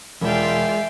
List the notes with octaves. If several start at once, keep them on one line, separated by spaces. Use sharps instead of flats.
E1 G#3 F4 D5 E5 F5 G5